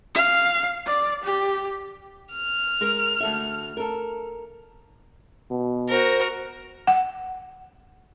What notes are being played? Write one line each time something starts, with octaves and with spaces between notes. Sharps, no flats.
F5
D5
G4
F6
G#3 A#4
D2 A4 E5
A4 A#4
B2
F#4 A#4 C5
F#5